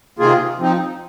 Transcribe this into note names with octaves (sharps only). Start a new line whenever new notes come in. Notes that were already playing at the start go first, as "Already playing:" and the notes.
C3 D#3 A#3 F4 G#4
F3 C4 D#4